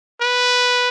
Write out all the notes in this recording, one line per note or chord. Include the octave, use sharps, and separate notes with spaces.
B4